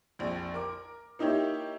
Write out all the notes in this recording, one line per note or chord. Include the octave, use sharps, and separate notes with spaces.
A#1 F2
A#4 D6
A#3 D#4 E4 G4 C#5